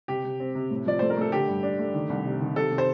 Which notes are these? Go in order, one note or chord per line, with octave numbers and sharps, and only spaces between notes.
C3 G4
C3
C4
C3
A2
F3 D5
A3 C5
A#4
A3 A4
D3 G4
G2
D4
A3
D#3
C2
C3
D#3
C3 A4
C3
C5